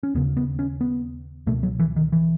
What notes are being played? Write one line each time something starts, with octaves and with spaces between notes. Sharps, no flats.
C#4
D#2 C#3 B3
B3
C#4
B3
C#2 B2 A3
F#3
E3
D#3
E3